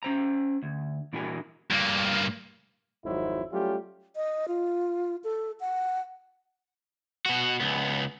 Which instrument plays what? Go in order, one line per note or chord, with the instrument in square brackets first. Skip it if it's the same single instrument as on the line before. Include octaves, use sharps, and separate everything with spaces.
[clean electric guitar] C#4 C5 A#5
D2
A#2 E3 D4 F#4 A#4 G#5
[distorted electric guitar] G2 A#3
[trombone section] G#1 F2 F#3 D#4 E4 C5
F#3 G3 A3 C#4 F4 G4
[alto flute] D#5
F4
A4
F#5
[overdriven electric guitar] B2 F#4
C#2 B3